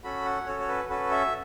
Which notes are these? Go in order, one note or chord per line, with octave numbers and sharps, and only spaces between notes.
C#4 F#4 A4 B5
F#5
C#4 F#4 A4 C#5
C#5
B4
C#4 F#4 A4 B4
E5